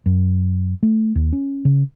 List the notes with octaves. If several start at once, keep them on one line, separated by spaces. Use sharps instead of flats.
F#2
A3
D#2
C#4
C#3